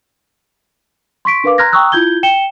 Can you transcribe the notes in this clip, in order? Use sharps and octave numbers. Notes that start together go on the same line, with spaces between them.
C6 C#6 B6 D7
D4 A#4 B4 F5 D6
A#5 C6 F6 F#6 G#6 A#6
G5 A#5 C#6 D#6 E6 F#6
E4 F4 G6 G#6 G7
G5 C#7 E7 G7